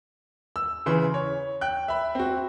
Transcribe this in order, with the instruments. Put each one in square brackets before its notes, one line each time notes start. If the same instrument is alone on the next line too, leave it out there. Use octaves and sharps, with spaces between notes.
[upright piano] E6
C#3 E3 C6
C#5
G5 F#6
E5 B5
C4 F#4